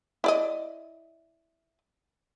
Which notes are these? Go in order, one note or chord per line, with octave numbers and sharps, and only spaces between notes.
E4 D5 D#5